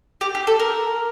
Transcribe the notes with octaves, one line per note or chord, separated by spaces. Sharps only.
G4
G4
A4
A#4